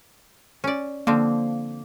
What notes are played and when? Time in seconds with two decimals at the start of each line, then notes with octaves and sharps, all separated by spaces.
0.64 C#4 D5
1.07 D3 F3 A#3 C4